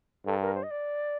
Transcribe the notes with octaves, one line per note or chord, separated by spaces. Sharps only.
G2 A4
A#4
C5
D#5
D5